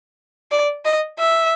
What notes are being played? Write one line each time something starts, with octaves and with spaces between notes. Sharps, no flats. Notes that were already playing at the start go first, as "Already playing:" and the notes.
D5
D#5
E5